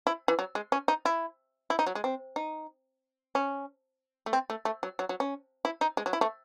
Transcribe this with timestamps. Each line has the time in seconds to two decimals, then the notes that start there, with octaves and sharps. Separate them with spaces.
0.07 E4
0.28 E3
0.39 F#3
0.55 G#3
0.72 C#4
0.88 D#4
1.05 E4
1.70 E4
1.79 D#4
1.86 F#3
1.95 G#3
2.04 C4
2.36 D#4
3.35 C#4
4.26 A3
4.33 C4
4.50 A3
4.65 A3
4.83 F#3
4.99 F#3
5.09 F#3
5.20 C#4
5.65 E4
5.81 D#4
5.97 G#3
6.06 F#3
6.13 E4
6.21 A3